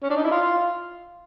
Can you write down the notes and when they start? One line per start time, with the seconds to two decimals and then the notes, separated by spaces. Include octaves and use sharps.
0.03 C#4
0.10 D4
0.16 D#4
0.24 E4
0.31 F4